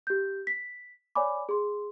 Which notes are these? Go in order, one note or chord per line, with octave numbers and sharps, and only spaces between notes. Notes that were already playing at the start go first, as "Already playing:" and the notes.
G4 G6
B6
C#5 D5 G#5 B5 D6
G#4 C6